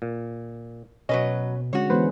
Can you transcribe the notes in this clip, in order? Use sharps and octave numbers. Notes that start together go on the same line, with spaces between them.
A#2
B2 F#3 C#4 B4 D#5
D3 G#3 C#4 F#4 C#5
E3 G#3 B3 G#4 B4 C5